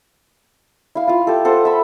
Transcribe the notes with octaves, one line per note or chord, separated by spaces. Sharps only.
E4 F5
F4 F5
G4 A4
A4 C5 F#5
E5 B5